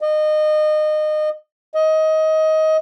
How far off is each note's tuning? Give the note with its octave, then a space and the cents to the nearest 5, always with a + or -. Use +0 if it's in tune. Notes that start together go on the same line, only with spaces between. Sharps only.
D#5 -25
D#5 +20